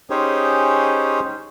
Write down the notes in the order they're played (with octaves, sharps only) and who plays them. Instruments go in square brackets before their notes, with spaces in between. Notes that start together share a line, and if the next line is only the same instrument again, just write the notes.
[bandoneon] C#4 D#4 G4 G#4 C5 C#5